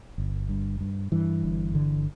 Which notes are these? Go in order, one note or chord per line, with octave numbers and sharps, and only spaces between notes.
G1
G2
G2
G2 E3
G1
D3